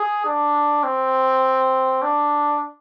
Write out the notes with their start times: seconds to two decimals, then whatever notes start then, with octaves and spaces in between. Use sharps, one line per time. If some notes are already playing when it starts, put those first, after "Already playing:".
Already playing: G#4
0.25 D4
0.84 C4
2.02 D4